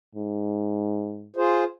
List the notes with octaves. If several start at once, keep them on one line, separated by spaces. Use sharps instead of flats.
G#2
F4 G#4 C5